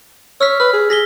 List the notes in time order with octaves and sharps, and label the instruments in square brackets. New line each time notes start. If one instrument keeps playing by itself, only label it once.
[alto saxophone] C#5 [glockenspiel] E6 F6 B6
[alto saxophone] B4 [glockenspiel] F6
[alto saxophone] G#4
[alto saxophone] G#4 [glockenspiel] A#6 B6 G7